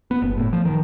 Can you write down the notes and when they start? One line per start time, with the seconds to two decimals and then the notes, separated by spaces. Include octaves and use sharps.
0.11 B3
0.22 F#1
0.37 A2
0.53 F3
0.65 D#3